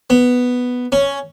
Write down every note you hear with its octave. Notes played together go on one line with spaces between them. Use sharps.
B3
C#4